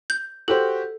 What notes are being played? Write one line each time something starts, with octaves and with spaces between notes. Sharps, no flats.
G6
F#4 G4 A4 C5